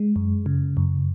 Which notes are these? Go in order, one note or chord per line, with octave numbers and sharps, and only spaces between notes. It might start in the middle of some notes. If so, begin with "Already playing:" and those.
Already playing: G#3
F#2
C#3
F#2